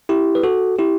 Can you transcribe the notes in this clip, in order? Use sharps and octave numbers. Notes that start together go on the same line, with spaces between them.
E4 G4
B4
F#4 A4
E4 G4